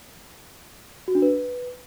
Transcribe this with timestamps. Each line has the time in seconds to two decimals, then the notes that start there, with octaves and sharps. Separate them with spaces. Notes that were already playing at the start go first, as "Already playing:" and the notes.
1.08 F#4
1.15 D4
1.22 B4